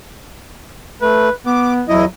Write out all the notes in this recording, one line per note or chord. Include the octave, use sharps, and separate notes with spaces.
A3 B4
B3 D6
E2 F#3 E4 D#5